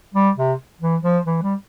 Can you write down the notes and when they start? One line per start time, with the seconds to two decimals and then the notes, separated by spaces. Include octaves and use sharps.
0.14 G3
0.37 C3
0.81 E3
1.03 F3
1.26 E3
1.43 G3